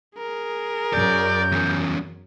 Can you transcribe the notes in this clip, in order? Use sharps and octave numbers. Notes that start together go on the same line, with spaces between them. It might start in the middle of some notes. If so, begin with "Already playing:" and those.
G#4 A#4
F#2 D5 G6
E2 C#4